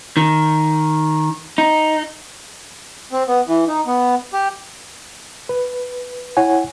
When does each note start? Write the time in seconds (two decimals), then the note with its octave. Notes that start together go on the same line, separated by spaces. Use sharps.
0.17 D#3
1.58 D#4
3.12 C4
3.28 B3
3.48 E3
3.67 D#4
3.87 B3
4.33 G4
5.49 B4
6.37 E4 C#5 F#5 G#5